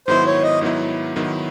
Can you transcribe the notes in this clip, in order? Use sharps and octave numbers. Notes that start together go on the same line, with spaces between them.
G#2 D#3 F#3 B3 E4 C5
C#5
D#5
G#2 D#3 F#3 B3 E4
G#2 D#3 F#3 B3 E4